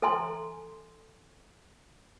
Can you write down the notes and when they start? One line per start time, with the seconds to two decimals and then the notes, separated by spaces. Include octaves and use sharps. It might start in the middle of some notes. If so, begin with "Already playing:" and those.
0.02 A4 E5 G#5 A#5 C6